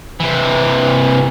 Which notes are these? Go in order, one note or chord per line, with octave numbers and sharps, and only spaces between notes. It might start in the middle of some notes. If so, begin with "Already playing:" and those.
C3 E3